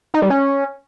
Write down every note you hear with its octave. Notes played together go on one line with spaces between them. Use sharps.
D#4
G3
C#4